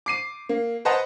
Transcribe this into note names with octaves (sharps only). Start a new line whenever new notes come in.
D6 C7 D#7
A#3
B4 C5 D#5 F#5 A5 A#5